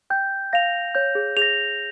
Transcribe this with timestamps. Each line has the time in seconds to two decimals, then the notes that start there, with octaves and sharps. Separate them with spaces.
0.10 G5 G6
0.53 F5 A#6 F7
0.95 C#5 G6
1.15 G#4
1.37 G#4 F7
1.42 A#6